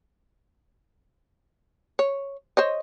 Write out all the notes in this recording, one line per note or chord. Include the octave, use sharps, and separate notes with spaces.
C#5
C5 C#5 D#5